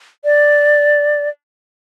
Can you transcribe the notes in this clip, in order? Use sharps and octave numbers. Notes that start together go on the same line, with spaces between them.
D5